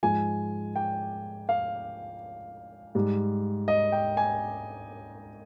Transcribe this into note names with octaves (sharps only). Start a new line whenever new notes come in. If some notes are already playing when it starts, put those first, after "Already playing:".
G#2 F3 G#3 G#5
G5
F5
G#2 G3
D#5
G5
G#5